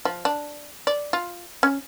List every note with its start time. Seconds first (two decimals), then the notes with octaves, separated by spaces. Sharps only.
0.05 F3
0.25 D4
0.87 D5
1.13 F4
1.63 C#4